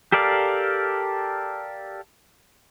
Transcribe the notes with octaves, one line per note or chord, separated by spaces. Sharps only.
G4 A4 A#4 D5 F5